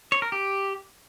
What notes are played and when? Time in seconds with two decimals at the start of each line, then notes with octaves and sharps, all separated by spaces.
0.12 C#5
0.22 A#4
0.32 G4